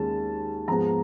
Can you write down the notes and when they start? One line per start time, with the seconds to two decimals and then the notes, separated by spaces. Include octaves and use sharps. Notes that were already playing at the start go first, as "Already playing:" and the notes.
Already playing: D#2 D#3 G#3 C#4 A5
0.68 G#2 F3 G#3 B3 A#5